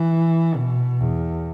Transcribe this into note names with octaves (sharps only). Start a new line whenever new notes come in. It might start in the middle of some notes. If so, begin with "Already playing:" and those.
Already playing: E3
B2
E2